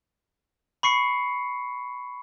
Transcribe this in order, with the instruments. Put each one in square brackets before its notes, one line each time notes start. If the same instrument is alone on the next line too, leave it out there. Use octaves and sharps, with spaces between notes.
[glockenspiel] B5 C#6 C7 C#7